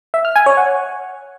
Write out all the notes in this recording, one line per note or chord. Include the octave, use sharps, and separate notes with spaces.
E5
F6
G#5
C#5
F#5